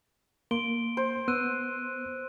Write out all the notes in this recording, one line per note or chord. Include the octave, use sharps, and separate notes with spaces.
A#3 C6 D7 G7
C5
B3 E6 F#6 D#7